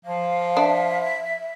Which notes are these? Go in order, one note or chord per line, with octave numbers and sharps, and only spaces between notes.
F3 F5
D4 E5